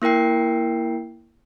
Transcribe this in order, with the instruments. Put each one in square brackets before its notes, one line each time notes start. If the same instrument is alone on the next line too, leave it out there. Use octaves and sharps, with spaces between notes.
[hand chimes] A#3 E4 A#4 G5 C7